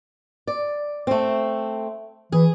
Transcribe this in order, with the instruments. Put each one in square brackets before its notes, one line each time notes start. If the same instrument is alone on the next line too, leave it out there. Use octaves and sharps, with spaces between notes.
[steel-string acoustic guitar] D5
A3 C4
[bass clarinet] E3 [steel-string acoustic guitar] G#4